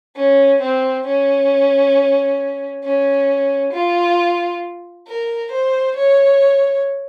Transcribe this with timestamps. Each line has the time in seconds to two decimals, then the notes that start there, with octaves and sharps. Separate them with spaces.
0.16 C#4
0.61 C4
1.06 C#4
2.84 C#4
3.73 F4
5.07 A#4
5.51 C5
5.96 C#5